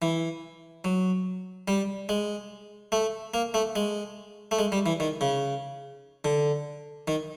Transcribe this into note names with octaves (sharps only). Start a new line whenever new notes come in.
E3
F#3
G3
G#3
A3
A#3
A3
G#3
A3
G#3
G3
E3
D#3
C#3
D3
D#3